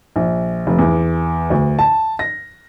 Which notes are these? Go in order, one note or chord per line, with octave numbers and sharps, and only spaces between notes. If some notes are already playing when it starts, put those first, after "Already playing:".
A#1
F1
E2
D2
A5
A#6